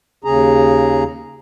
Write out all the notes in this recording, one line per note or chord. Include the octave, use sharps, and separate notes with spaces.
D#2 C#3 G#4 A#5